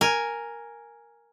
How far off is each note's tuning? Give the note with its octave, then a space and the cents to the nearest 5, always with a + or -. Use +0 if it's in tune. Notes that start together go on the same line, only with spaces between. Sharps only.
A#4 +0 G#5 +0